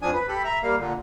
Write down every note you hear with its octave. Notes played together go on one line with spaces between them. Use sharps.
F2 F3 D4 G#5 D#6
B4
G4 A4 B5
E5 A#5
G3 A#3 F5
A#2 D3